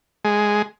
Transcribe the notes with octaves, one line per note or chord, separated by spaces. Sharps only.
G#3